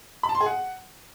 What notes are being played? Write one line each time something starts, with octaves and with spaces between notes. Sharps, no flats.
B5
A5
C6
G#4
F#5